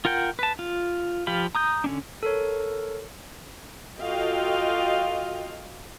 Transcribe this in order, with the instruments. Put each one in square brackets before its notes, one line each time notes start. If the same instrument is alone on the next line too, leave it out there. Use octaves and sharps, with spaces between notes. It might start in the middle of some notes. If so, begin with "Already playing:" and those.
[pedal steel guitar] F4 A#4 F#5 G5
B4 A5
F4
F3 F4 G4 F5 B5
A#5 D#6 G6
D3 C#4 D4
[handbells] A4 A#4 C#5
[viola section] F4 F#4 A4 D#5 F5 G5